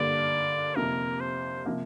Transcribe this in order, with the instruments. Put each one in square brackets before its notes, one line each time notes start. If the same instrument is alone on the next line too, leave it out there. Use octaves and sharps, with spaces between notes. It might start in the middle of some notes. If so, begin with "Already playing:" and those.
Already playing: [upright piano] G2 D3 A#3 [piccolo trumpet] D5
[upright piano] F2 C3 A#3 [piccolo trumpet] A#4
[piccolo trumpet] C5
[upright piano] C3 F3 A#3